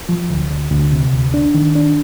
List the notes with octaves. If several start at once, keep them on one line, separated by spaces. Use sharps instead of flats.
F3
D2
D2
D2
C3
D2
D4
D#3
D4